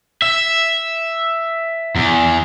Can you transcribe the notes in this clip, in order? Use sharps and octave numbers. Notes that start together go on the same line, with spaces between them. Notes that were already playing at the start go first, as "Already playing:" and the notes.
E5
E2